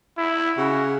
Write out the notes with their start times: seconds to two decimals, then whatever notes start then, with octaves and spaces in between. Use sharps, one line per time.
0.18 E4
0.58 C#3 F#4